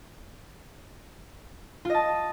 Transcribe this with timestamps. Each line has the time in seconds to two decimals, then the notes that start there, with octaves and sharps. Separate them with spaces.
1.85 F4
1.90 D#5
1.94 A5